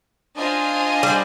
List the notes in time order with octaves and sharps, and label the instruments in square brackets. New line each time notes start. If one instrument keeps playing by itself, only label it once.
[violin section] D4 F4 C5 D#5 G#5
[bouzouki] G3